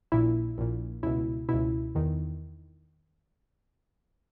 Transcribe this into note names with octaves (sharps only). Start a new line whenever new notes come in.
A#1 A#2 E4
A#1 A#2
C#2 B2 E4
C#2 B2 E4
E2 D#3